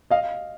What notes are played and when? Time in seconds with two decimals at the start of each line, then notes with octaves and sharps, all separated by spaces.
0.10 D#5 F5